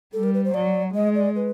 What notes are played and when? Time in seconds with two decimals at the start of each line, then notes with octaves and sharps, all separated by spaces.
0.13 G3 A4
0.23 A#4
0.34 B4
0.44 C5
0.54 F#3 D5
0.95 G#3 D#5
1.15 D5
1.36 B4